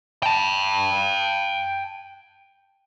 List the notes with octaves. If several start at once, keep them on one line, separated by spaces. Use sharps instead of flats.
G5 A5